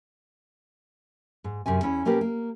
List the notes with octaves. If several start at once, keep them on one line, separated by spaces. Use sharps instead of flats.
G#2
F#2 C3 C#4 G#5
E2 C#4 E4 C#5
B2 A#3 C#4 G4 A#4 B4
A#3